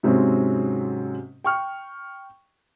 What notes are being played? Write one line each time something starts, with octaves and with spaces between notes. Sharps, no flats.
G#2 C3 F#3 G#3 C4 C#4
G5 C#6 F6